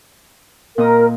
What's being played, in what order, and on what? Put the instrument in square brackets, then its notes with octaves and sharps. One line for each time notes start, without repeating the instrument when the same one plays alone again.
[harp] A#2 D#5 D#6 [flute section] A#4